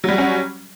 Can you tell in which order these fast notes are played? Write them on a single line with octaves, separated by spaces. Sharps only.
F#3 G3 F#4 C#4